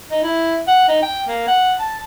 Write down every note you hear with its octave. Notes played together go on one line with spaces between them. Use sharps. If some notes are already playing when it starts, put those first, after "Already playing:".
D#4
E4
F#5
D#4
G5
A#3
F#5
A5